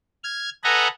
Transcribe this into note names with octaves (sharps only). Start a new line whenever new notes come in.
F6 G#6
A4 B4 D#5 F#5 G#5 A#5